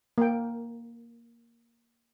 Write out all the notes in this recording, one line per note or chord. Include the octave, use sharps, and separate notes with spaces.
A#3 G5